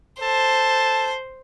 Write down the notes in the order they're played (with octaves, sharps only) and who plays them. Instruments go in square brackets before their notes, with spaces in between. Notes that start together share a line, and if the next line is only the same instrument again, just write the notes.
[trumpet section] A4 A5 [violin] C5